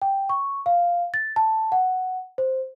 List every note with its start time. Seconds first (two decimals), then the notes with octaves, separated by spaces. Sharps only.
0.02 G5
0.29 C#6
0.66 F5
1.14 A6
1.36 A5
1.72 F#5
2.38 C5